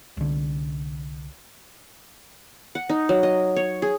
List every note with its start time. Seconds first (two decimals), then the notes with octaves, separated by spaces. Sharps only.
0.17 C2 D3
2.75 F#5
2.89 D#4
3.09 F#3
3.23 D#5
3.56 C#5
3.82 G#4